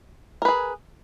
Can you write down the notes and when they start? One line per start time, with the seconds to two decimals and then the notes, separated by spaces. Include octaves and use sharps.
0.42 A#4
0.45 B4
0.48 G#4